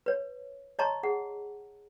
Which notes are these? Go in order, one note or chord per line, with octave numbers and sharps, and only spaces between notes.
B4 C#5
C#5 D#5 A5 A#5 C6 C#6
G#4 F#5